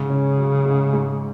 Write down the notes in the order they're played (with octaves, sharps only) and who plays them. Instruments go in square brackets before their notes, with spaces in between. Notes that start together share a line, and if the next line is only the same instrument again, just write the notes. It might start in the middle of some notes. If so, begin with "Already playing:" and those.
Already playing: [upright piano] G#2 [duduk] C#3
[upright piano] C#4
F#3
G#2
G#2